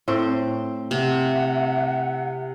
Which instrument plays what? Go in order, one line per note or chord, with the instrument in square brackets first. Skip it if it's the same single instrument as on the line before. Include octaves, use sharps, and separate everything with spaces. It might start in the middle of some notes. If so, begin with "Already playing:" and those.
[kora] A2 C4 C5
[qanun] C3 [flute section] E5 F#5